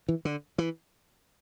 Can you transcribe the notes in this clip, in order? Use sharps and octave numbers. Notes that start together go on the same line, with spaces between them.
E3
D3
E3